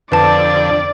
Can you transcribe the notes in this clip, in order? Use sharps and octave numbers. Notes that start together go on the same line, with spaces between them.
F2 D3 B4 D5 A5